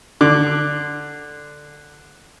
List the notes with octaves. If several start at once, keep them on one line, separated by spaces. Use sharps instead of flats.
D3 D6